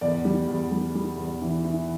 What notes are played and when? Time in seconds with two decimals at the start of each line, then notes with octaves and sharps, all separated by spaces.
0.01 E2 D5
0.25 G3
0.47 E2
0.72 G3
0.95 G3
1.18 E2
1.41 E3
1.65 E3